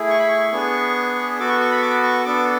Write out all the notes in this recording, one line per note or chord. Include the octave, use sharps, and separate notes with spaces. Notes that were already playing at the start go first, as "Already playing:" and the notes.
Already playing: A3 E4 G#4
C#6
B5
C#6
B3 D4 G#4
B3 F#4 A4 D6
C#6
C#6
B5
D6
C#6
B3 D4 A4 D6